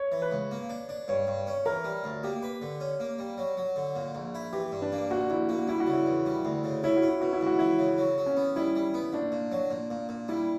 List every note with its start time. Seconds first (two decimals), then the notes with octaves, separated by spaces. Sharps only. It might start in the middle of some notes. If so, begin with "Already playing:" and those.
Already playing: C#5
0.12 E3
0.22 B4
0.32 C#2
0.51 A#3
0.70 D4
0.89 D4
1.08 G2 C#5
1.27 G2
1.47 C#4
1.66 E3 A#4
1.85 G3
2.04 D2
2.24 A#3 G4
2.43 B4
2.62 D3
2.80 C#4
3.00 A#3
3.19 G3
3.38 F#3
3.57 F#3
3.76 D3
3.96 A#2
4.15 A#1
4.35 E4
4.53 E3 G4
4.72 G2
4.82 D4
4.92 A#3
5.11 A#1 F#4
5.30 A#1 E4
5.49 A#3 F#4
5.68 G3 E4
5.80 F#4
5.87 C#3
5.93 E4
6.06 E2
6.26 G3
6.45 D2
6.64 C#3
6.84 C#4 E4
6.96 F#4
7.02 C#4
7.09 E4
7.21 B2 F#4
7.33 E4
7.41 C#2
7.46 F#4
7.59 E3 E4
7.79 C#3
7.98 F#3
8.18 F#3
8.26 C#4
8.37 B3
8.56 G3 E4
8.76 G3
8.94 B3
9.13 A#1 D4
9.32 A#2
9.52 F#3
9.71 A#2
9.90 A#2
10.09 A#2
10.29 G3 E4